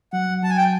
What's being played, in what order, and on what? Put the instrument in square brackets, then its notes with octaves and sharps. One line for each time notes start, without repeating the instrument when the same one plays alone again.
[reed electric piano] F#3 [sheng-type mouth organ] F#5
[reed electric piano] F#2
[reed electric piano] F#3 [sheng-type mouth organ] A5
[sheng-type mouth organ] G#5
G5